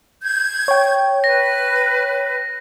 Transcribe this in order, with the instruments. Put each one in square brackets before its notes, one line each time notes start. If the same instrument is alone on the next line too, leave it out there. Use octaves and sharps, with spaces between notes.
[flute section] G6 G#6
[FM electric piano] C#5 G5
[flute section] B4 [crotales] A#6